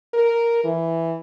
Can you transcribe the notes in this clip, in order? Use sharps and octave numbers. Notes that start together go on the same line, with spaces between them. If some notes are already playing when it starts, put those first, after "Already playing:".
A#4
E3